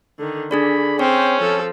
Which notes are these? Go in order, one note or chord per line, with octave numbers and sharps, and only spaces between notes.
D3 D#3
D3 D4 G#4 D5 B5
C4 C#4 G#4 C5 C#5
F3 A4